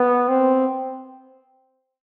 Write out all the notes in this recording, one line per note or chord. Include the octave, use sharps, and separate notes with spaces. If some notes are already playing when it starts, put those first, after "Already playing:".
Already playing: B3
C4